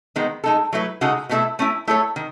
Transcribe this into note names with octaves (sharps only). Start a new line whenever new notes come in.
D#3 G#3 B3 D#4
G#3 D#4 A4
F#3 A3 E4 B4
C#3 G#3 D#4 F#4 A4
B2 A3 E4 A4 E5
A3 C#4 E4
A3 E4 A4 C#5
D#3